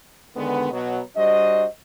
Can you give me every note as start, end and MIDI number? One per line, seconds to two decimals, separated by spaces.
0.37 0.70 50
0.37 0.70 51
0.37 0.70 56
0.37 0.70 59
0.72 1.01 47
0.72 1.01 54
1.17 1.65 55
1.17 1.65 62
1.17 1.65 66
1.17 1.65 72
1.17 1.65 75